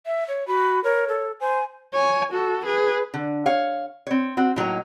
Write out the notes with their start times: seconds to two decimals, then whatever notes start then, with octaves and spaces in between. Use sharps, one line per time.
0.06 E5
0.28 C#5
0.47 F#4 B5
0.84 A#4 C#5
1.08 A4
1.41 C5 G#5
1.93 C#5 G#5
2.33 F#4 A4
2.66 G#4 B4
3.14 D3
3.46 C#5 F5
4.07 C4 C#5
4.37 C4 F#4
4.56 A2 F#3 A#3 D#4